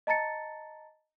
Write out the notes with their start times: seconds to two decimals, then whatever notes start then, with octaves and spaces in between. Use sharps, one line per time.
0.07 D#5 A5 A#5 A6 C#7